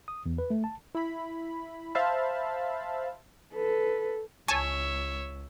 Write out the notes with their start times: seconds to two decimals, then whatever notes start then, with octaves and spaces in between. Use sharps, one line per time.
0.08 D#6
0.26 E2
0.38 B4
0.50 A3
0.64 A5
0.95 E4 B5
1.95 C5 E5 F5 A5 B5
3.54 A4 B4
4.48 C#2 C#5 E5 G#5 A5 C#6